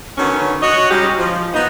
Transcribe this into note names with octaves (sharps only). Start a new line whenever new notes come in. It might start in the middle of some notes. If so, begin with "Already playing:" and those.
D3 D#3 F#3 B3 C#4
F#4 C#5 D#5
G3 G#3 C#4 D#4 F#4 G4
F3
B3 D#4